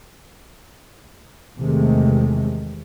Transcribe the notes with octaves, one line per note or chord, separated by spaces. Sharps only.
E2 C3 D#3 G#3 A3